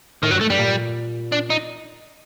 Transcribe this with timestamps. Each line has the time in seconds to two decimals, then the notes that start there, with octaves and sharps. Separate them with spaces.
0.23 A2 D#3
0.31 G2 F#3
0.41 A3
0.50 G2 G3
0.59 A#2
1.32 D4
1.50 D#4